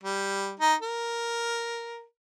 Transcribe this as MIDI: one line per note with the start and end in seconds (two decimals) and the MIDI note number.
0.03 0.53 55
0.60 0.74 63
0.82 2.03 70